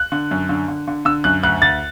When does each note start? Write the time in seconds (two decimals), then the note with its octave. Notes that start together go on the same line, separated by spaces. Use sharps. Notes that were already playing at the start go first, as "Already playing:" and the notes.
Already playing: F#6
0.12 D3
0.31 F#2
0.49 D3
0.68 D3
0.88 D3
1.05 D3 E6
1.24 F#2 F#6
1.43 D2 F#6
1.62 D2 A6